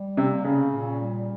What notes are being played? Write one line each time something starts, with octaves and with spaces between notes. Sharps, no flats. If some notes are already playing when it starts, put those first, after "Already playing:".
Already playing: G3
C3 A#3
C#3 C#4
A#2
G3